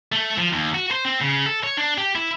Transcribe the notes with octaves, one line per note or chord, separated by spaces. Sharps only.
A3
F3
D#2
F#4
C5
C4
C#3
A4
C#5
D4
G4
E4